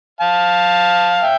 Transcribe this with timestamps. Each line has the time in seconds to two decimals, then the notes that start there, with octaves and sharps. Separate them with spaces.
0.21 F5 A5
1.23 E5 G5